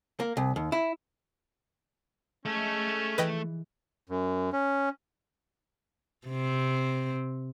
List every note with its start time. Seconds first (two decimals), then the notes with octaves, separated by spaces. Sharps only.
0.20 A#3
0.37 C2
0.56 D#2
0.72 E4
2.45 G#3 A3 C#4 A4
3.18 E3 B4 D#5 G5
4.09 F#2
4.53 C#4
6.28 C3 C4